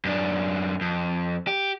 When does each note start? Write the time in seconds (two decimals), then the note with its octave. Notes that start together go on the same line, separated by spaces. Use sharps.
0.05 F#2 D4
0.81 F2
1.47 G4